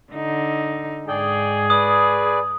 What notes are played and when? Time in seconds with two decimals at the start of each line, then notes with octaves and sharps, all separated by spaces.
0.13 D3 D#4
1.08 G#2 G#4 D5 G5
1.70 B4 D5 D#6